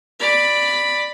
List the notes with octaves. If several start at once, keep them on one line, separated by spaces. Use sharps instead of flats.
D5 B5